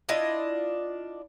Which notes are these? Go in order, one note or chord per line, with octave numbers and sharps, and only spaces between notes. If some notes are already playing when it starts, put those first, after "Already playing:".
D4 E4 F4 D#5